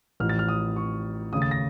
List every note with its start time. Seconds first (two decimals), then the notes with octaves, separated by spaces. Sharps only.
0.20 A1 A2 F3 F6
0.29 A6
0.39 F6
0.48 D#6
0.76 C#6
1.33 D#2 C#3 A3 D#6
1.42 A6
1.51 A#6